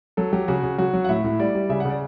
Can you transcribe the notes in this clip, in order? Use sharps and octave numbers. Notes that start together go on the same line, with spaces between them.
F#3 A4
F#3 G4
C#3 F#4
C#3
F#3 F#4
F#3
F#5
A2 E5
A2
G3 D5
G3
C#3 E5
C#3 F#5
D5